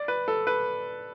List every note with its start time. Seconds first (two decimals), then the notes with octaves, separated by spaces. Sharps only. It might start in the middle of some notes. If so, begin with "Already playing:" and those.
Already playing: D5
0.08 B4
0.28 A4
0.47 B4